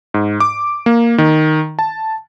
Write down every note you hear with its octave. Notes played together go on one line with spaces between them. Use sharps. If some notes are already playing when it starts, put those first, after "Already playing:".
G#2
D6
A#3
D#3
A5